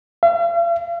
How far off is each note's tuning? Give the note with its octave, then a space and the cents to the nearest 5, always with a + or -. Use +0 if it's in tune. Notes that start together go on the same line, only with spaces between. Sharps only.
F5 -45